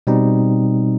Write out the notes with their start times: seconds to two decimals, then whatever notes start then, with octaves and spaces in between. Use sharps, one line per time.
0.07 B2 G3 C4 D#4